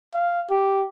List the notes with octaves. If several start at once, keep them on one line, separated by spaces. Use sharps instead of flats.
F5
G4